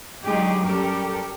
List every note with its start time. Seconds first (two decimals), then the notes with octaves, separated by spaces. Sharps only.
0.24 D3 F#3 G#3 D#4 G4 G#4
0.63 F#2 G3 G4 A4 A#4